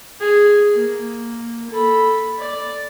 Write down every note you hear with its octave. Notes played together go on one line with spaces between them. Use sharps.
G#4
A#3
A4 B5
D5